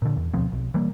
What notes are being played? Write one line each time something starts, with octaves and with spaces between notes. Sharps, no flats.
A#2 D3
E2
D2 B2 F3 C4
B1
E3 G3 A#3